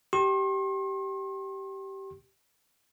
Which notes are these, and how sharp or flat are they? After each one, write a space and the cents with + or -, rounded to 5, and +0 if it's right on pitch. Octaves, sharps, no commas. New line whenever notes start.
G4 -15 C6 +45